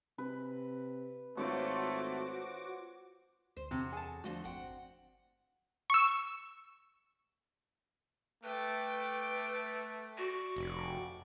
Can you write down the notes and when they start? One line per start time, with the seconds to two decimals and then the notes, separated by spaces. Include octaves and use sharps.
0.18 C3 B4
1.37 G#1 A3 F4 F#4 C5 C#5 D6
3.56 D2 C5
3.71 E2 C3 F#4 A4
3.93 G#4 A5
4.24 D3 F3 A3 F#4
4.44 G1 C4 F#5 G5
5.90 C#6 E6
8.43 A3 B4 G5 D6
10.18 F#4 D5 C#6
10.56 F1